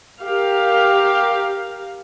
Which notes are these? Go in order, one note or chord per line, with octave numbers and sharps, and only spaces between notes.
G4 A#4 F5